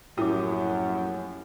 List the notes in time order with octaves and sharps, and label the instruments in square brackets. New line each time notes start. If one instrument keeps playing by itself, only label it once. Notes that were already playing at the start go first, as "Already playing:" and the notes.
[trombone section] A#1 F#2 [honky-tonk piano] A2 G4 D#6 [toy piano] E4 D6